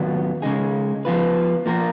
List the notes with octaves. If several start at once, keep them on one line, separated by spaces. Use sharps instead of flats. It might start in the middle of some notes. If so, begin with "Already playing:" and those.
Already playing: D#2 D#3 F#3 B3 F4
C#2 C#3 G#3 D#4 G#4
F3 B3 F4 B4
F3 A#3 F4 A#4